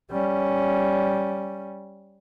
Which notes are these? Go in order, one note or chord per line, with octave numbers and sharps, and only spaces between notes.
G3 C#4